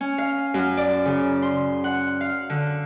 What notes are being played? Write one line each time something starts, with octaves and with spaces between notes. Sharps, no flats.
C#4
F5
F#2
D5
C#3
C6
F#5
F5
D3